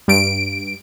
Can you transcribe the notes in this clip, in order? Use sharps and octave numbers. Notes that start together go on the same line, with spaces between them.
G2 D7